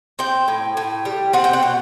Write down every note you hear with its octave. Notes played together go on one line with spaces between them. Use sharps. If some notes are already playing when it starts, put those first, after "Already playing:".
C4 G5
A2
A2
G3
C4 F#5
G5
F#5
B2